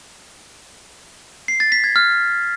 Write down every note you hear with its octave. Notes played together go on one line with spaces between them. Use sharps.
C7
A6
B6
G#6
F6